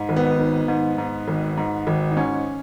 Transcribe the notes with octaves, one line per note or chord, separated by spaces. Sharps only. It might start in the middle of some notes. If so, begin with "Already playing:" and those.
Already playing: G#2
G#1
B3
D#3
G#2
G#2
G#1
G#2
G#1
D#4
G#2 C#4